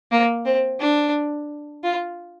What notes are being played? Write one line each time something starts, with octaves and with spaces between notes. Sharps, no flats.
A#3
C4
D4
F4